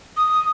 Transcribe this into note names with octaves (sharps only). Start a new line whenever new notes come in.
D#6